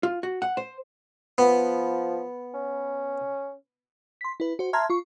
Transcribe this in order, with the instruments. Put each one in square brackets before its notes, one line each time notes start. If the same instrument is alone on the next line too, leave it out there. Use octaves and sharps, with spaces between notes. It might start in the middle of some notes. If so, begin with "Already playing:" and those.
[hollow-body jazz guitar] F4
F#4
F#5
C5
[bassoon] F3 [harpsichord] B3
[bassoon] C#4
[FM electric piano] C6 B6
E4 B4
F#4 C5
E5 A5 A#5 C6 F6 G#6
F4 C#6